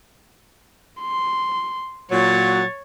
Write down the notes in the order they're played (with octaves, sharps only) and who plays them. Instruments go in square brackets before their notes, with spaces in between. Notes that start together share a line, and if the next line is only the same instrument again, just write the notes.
[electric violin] C6
[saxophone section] A#2 F#3 [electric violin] C#5 A6